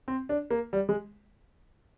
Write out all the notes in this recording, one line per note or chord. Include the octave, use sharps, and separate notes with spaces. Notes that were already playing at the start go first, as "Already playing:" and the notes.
C4
D4
A#3
G3
G#3